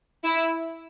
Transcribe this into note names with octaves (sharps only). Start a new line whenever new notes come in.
E4